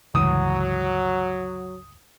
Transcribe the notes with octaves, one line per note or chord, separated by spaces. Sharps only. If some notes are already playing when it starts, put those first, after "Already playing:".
G1 C#2 E3 F#3 D#6